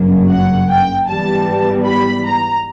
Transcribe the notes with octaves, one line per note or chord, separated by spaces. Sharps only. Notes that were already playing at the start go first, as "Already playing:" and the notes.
Already playing: G1 F#2 C#3 F#3 A#3
F#5
G5
G#2 E3 G3 B3 A5
B5
A#5